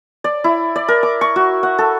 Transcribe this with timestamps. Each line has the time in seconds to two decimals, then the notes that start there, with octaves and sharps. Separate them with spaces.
0.24 D5
0.44 E4
0.76 D5
0.88 A#4
1.03 D6
1.21 C#6
1.36 F#4
1.63 F#5
1.79 A4